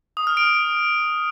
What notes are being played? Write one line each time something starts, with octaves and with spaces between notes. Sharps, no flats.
D#6
F6
D7